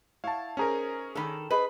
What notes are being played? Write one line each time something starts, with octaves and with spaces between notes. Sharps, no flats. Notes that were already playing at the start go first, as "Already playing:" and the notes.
E4 C#5 F5 F#5 A5
C#4 D#4 G#4 A#4 C5 A#5
D#3 D4 A4 B5
G#4 B4 C5 D#5